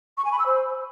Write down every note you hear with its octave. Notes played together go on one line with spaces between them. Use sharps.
C#6
G#5
B5
E6
C5